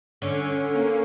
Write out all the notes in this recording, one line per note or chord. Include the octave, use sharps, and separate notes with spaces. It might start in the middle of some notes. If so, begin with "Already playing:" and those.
D3 C#4
A#3